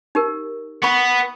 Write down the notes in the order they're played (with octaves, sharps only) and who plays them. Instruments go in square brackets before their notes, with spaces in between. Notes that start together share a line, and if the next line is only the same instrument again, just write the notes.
[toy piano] D#4 G4 A#4
[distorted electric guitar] B3 [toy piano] B5 C#6